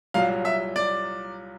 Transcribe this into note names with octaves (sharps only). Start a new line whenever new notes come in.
C2 A#2 F#3 F5
E5
D5